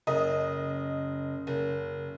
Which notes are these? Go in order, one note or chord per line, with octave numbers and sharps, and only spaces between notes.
F#1 D#5
F#1